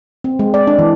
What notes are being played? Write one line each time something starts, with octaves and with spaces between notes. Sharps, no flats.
C4
G#3
D5
D4
E3